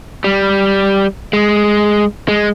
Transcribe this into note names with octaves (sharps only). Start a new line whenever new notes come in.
G3
G#3
G#3